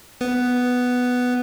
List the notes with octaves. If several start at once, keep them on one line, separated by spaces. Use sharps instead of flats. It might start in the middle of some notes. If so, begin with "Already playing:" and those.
B3